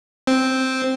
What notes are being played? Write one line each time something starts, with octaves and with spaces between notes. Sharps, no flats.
C4